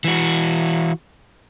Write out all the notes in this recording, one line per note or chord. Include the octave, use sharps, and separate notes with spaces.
E3 F#4